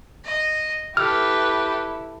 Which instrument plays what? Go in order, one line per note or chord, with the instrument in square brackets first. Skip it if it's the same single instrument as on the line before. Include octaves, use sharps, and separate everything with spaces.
[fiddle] D#5
[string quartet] E4 [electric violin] G4 B4 [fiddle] A4 [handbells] F6